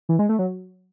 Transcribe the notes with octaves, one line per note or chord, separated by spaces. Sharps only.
E3
G#3
A3
F#3